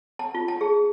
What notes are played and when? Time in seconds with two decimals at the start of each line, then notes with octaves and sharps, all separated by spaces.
0.19 A5
0.35 F4
0.48 A5
0.61 G#4